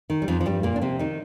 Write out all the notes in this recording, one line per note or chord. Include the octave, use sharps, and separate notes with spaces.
D#3
G3
F2 F3
F3
G2 G3
A#2 A#3
D4
C3 C4
D#3 D#4